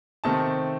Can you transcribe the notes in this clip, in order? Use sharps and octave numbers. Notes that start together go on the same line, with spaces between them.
C3 D#3 A3 C4 A5